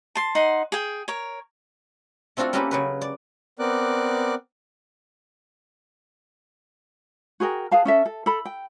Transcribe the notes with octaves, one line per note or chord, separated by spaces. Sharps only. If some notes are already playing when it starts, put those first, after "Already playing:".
A5 C6
D#4 F#5 C6
G#4 G5
A#4 C#5
A3 C4 D4 F4 F#4 A4
A#3 C#4 F#4 G4 A4 B4
C#3 F#3 B4
D5
B3 C4 A#4 D5 D6 F#6
F#4 G#4 A#4 G5
G#4 B4 F5 A5
C#4 A4 E5
A4
A4 B5
G5